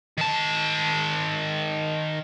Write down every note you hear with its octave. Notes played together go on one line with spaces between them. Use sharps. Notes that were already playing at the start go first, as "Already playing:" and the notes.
D#3 A5